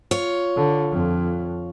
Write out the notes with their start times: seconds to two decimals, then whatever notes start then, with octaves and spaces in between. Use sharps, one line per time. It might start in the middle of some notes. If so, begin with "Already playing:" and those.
0.11 F4 C#5
0.56 D3
0.92 F2